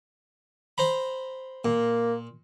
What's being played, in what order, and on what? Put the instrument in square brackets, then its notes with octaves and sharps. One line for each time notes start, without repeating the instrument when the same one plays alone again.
[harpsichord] C5 A#5 B5
[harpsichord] A#2 [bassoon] A#3